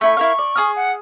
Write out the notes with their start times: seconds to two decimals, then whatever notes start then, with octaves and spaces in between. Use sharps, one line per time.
0.01 A3 E4 B5 C#6
0.17 E4 A#4 F5
0.38 D5
0.56 G#4 D#6 F6
0.76 F#5